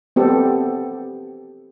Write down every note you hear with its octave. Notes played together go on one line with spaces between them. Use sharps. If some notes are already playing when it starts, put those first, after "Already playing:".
B3 C4 G4 A4